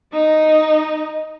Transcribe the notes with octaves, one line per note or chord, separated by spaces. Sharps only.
D#4 D#5